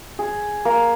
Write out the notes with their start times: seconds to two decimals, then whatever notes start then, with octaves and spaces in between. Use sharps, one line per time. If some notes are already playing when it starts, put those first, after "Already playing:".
0.19 G#4
0.65 A#3